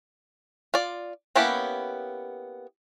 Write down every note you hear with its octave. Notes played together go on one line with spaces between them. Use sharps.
F4 D5
A#3 B3 C#4 E4 G4